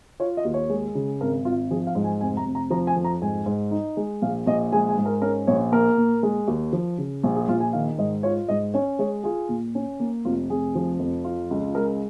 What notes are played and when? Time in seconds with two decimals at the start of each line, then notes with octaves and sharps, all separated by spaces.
0.20 F4 C#5
0.37 D#5
0.45 D#2
0.54 C#5
0.70 G#3
0.95 C#3
1.21 G#1 A#4
1.45 G#1 F4
1.71 F3 G#4
1.87 F5
1.95 G#2
2.04 G#5
2.21 F1 G#5
2.37 A#5
2.46 F1
2.55 A#5
2.71 F3 A#5
2.87 G#5
2.96 F2
3.04 A#5
3.22 G#2 G#5
3.46 G#2
3.71 D#4
3.97 G#3
4.22 A#1 F5
4.47 A#1 D#5
4.72 G#3 G#5
4.89 G#5
4.97 G#2
5.06 A#4
5.22 C#4 A#4
5.47 A#1 C#5
5.72 A#3 A#4
5.97 A#2
6.23 G#3
6.48 D#2
6.73 F3
6.98 C#3
7.23 A#1
7.36 G#4
7.48 A#1 F4
7.60 G#5
7.73 D#3 F5
7.98 G#2 D#5
8.23 F4 C#5
8.49 G#2 D#5
8.74 C#4 C#5
8.99 G#3 C#5
9.24 F4 G#4
9.49 A#2
9.75 C#4
10.00 A#3
10.25 F1 F4
10.50 F1 G#4
10.75 F3
10.99 F2
11.25 F4
11.51 C#2
11.75 G#3 A#4